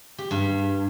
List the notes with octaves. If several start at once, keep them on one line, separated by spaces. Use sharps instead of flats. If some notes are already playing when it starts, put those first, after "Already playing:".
G4
G2